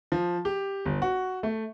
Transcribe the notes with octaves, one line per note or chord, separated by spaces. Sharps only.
F3
G4
G1
F#4
A3